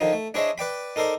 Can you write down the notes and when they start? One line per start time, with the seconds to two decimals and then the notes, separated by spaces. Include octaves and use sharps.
0.01 D3 D#3 F3 D#4
0.13 A3
0.34 D4 E4 G#4 C5 C#5 D#5
0.58 B4 D5 G5 B5
0.96 D#4 A4 A#4 C5 D5